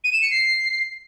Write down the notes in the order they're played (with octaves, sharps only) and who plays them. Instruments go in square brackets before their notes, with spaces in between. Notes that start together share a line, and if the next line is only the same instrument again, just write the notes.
[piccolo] D#7
E7
C#7
C7